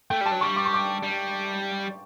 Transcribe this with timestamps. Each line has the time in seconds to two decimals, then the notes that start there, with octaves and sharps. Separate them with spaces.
0.10 A3 G5
0.21 G3 A5
0.32 F#3
0.41 G3 C#6
0.56 D6
0.66 C#6
0.74 D6
1.03 G3